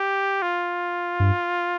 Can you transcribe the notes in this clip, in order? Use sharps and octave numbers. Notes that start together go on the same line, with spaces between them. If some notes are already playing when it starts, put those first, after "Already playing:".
Already playing: G4
F4
G2